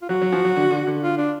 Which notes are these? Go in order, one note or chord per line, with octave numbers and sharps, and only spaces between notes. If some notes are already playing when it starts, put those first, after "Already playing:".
F4
F#3 F#4
F#3
F3
F#3
D3
D3
D3
F4
D4